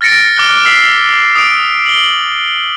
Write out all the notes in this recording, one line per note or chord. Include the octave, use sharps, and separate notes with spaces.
F6 A6 A#6 C#7 D7
D6 F6 F#6 G7
E6 F6 B6 C7
D#6 D7
F#7 G7